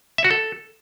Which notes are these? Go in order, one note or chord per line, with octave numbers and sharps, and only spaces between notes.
E5
F#4
A4